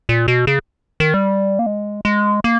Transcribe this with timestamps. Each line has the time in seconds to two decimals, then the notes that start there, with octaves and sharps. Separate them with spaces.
0.09 A#2
0.28 B2
0.47 C#3
1.00 D#3
1.14 G3
1.59 A#3
1.66 G#3
2.05 G#3
2.44 A#3